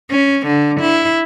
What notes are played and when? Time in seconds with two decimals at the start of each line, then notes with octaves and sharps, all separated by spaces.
0.10 C#4
0.46 D3
0.81 E4